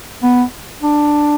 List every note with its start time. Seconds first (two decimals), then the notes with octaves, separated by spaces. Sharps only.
0.23 B3
0.82 D4